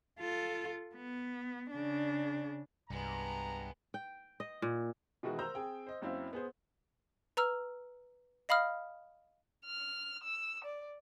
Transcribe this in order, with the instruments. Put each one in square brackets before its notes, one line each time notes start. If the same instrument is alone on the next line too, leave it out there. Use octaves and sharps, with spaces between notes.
[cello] F4 A4
B3
C#3 D4
[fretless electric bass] C2 [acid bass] G2 [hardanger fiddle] G#3 B3 [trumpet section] A#5
[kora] G5
D#5
A#2
[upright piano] B2 D#3 E3 G#3 F#4
A#4 C5 A#5 E6 G6
C4 G#4 G5 E6
C5 D#5
F#1 F#2 C4 E4 C5 F5
B3 G#4 C5
[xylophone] B4 A#5 E6 F6
D#5 F5 B5 D#6 F6
[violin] F6
E6
D5